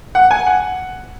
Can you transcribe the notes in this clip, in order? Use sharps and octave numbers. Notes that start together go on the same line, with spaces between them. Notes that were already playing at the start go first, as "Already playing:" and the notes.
F#5
G#5
F#5